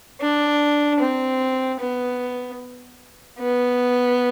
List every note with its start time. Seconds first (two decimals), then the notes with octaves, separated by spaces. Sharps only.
0.21 D4
1.00 C4
1.80 B3
3.38 B3